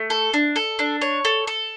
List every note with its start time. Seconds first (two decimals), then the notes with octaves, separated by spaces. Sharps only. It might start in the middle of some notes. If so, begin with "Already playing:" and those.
Already playing: A3
0.10 A4
0.34 D4
0.56 A4
0.79 D4
1.02 C#5
1.25 A4
1.47 A4